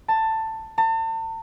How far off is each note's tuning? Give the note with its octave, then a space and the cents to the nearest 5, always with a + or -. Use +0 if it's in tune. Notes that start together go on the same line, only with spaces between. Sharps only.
A5 +15
A5 +40